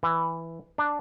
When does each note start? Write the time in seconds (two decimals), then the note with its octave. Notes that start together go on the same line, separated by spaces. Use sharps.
0.03 E3
0.78 D4